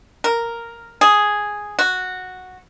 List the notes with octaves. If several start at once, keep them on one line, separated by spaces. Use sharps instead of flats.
A#4
G#4
F#4